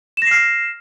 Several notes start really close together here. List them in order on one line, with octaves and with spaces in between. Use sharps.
E7 A#6 C7 F6